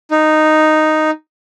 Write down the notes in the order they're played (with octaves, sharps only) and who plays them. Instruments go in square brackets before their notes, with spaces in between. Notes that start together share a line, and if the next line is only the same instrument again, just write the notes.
[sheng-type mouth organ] D#4